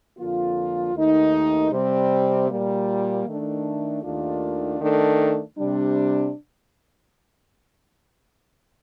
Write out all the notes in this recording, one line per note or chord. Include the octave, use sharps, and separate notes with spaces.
F2 D3 F3 A#3 F4
D#2 D#3 A3 D#4
C3 G3 C4
A#2 G3 A#3
D#3 A3 D4
D#2 D#3 A3 D4 F4
D#3 A3 D4 A4
C3 G3 D4